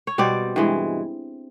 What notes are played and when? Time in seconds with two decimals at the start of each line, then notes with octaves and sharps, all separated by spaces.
0.07 C#5
0.18 B2 G3 C4 D5
0.56 G2 E3 G#3